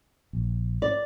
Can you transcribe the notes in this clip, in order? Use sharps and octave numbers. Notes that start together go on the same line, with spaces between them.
A#1
D5